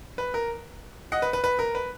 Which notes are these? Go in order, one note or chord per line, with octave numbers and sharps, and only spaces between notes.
B4
A#4
D#5 F#5
B4
B4
B4
A#4
B4